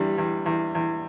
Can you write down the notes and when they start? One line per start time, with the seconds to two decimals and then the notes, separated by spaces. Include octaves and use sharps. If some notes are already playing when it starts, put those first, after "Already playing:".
Already playing: E2 D3 G3
0.18 E2
0.46 E2
0.75 E2